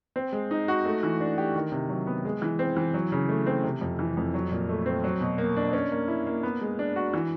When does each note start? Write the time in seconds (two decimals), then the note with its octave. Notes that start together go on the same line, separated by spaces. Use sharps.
0.16 C4
0.32 G#3
0.51 D#4
0.68 F#4
0.85 A3
1.03 E3
1.21 D4
1.38 G4
1.56 D#3
1.72 C3
1.89 F#3
2.07 B3
2.25 G#3
2.42 E3
2.59 C4
2.77 E3
2.94 F#3
3.12 C#3
3.29 A3
3.46 C4
3.64 C3
3.81 F2
3.99 E3
4.17 F2
4.34 F#3
4.52 A#2
4.69 A3
4.86 C4
5.04 F#3
5.21 B2
5.38 A#3
5.56 D4
5.73 C#4
5.92 A#3
6.08 E4
6.27 A#3
6.43 B3
6.61 G#3
6.79 D4
6.96 F#4
7.14 E3